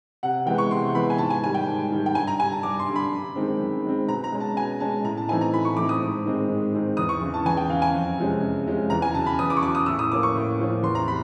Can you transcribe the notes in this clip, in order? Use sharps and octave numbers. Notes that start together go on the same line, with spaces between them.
C3 F#5
E3 G#3 B3 G5
C#6
C3 C6
E3 G#3 B3 B5
G#5
G#2 A5
G#5
D#3 G3 G#5
G5
G#2
D#3 G3
G5
G2 G#5
A#5
D3 G3 G#5
A5
G2 D6
C6
D3 G3
B5
F#2
D#3 G#3 C4
F#2
D#3 G#3 C4
B2 A#5
A#5
G#3 C#4
A5
B2 G#5
G#3 C#4 A5
A2 A#5
A5
E3 A3 C4 D#4 G#5
A#5
A2 B5
C#6
E3 A3 C4 D#4 D6
D#6
G#2
D#3 G#3 C4 D#4
G#2
D#3 G#3 C4 D#4
E2 D#6
C#6
C#3 E3
A5
E2 G#5
G5
C#3 E3 F5
G#5
F2
C3 F3 G#3 C#4
F2
C3 F3 G#3 C#4
E2 A#5
G#5
C#3 F#3 A5
B5
E2 D#6
D6
C#6
C#3 F#3 D6
D#6
A2 E6
D#6
F3 A#3 C#4 D6
C#6
A2
F3 A#3 C#4
E2 C6
A#5
C3 B5